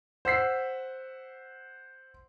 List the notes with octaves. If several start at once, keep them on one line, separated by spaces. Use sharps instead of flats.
C5 F#5 E6 B6 C7